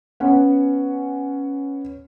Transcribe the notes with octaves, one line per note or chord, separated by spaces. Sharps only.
B3 C#4 F#5